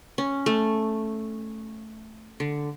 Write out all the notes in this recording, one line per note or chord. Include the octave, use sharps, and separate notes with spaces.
C#4
A3
D3